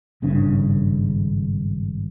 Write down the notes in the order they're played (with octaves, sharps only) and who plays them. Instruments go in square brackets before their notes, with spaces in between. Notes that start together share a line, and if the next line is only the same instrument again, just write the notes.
[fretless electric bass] G#1 G2 C#3 D4